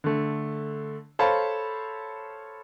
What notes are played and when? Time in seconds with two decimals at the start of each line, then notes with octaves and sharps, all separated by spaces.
0.04 D3 A3
1.19 A4 C5 C#5 F5 A5 B5